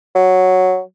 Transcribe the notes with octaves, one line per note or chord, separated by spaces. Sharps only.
F#3